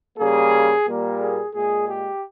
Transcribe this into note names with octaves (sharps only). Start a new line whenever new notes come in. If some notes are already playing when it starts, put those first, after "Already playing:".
C#3 G3 A#3 G#4
A#2 G3 A#3
G#4
A#2 G#3 G#4
G4